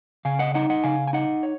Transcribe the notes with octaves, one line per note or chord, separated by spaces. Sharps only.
C#3 F5 G#5
D#5 F#5
D#4 D#5 F#5
D#5 F#5
C#3 F5 G#5
G#5
D#4 D#5 F#5
C#5